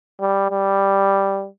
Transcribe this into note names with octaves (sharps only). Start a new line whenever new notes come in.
G3
G3